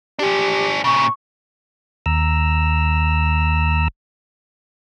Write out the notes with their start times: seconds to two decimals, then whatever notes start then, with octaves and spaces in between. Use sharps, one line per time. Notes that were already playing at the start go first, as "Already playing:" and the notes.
0.19 D4 G4 G#4
0.84 A#2 C#3 C#6
2.06 D#2 A#5 E6